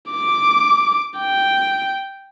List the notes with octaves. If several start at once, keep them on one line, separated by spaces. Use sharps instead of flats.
D6
G5